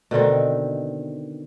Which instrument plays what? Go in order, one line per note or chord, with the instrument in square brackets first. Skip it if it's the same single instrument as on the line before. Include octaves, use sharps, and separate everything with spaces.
[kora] B2 D3 D#3 C4